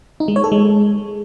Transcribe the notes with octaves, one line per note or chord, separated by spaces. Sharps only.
D#4
G#3
C#5
A4
G#3